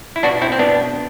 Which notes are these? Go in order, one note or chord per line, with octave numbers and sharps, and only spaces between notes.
E4
B2 D4 F#4
C4 E4
C4
B2 B3 D4